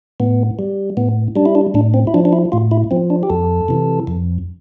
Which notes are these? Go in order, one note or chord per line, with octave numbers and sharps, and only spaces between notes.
A2 B3
G3
A2 B3
G3 D4
E4
D4
A2 D4
C4
E4
F3 D4
D4
E4
A2 F4
E4
F3 C4
D4
G4
F2 A4
C3 E3
F2